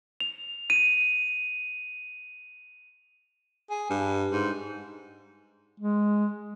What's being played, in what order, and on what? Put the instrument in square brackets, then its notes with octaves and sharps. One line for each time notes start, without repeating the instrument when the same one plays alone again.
[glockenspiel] F7
D#7
[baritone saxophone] G#4
G2
G#2
[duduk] G#3